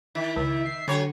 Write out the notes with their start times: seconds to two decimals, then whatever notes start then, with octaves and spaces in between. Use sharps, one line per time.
0.15 D#3 E4 B5
0.36 C#2 E5
0.66 C7
0.88 D3 F#3 C#5 G#5